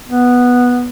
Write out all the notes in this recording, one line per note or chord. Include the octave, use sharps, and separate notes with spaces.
B3